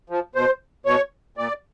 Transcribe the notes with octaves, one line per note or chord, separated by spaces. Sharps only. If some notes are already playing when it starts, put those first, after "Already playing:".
F3
B2 C5
B2 C#5
A#2 D5